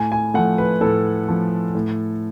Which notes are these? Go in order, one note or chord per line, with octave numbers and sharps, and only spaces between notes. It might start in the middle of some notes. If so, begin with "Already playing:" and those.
Already playing: A2 G#5
G#5
F3 A3 F#5
B4
A2 A4
F3 A3
A2